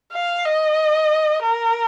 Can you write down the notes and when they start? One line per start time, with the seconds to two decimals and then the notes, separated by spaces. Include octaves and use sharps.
0.13 F5
0.45 D#5
1.43 A#4